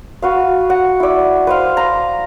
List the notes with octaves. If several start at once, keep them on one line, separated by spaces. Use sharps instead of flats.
F#4 B4 F5
F#5
E4 D5
B4 C5 F5
A#5